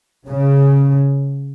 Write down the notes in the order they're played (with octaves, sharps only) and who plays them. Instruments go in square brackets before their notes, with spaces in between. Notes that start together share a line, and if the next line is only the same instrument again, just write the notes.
[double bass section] C#3